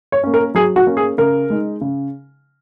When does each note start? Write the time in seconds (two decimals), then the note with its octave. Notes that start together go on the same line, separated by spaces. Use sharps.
0.12 C#5
0.23 A#3 C#4
0.34 A#4
0.54 F#3 G#4
0.76 F#4
0.87 A#3 C#4
0.97 G#4
1.18 C#3 A#4
1.50 G#3 D#4
1.81 C#3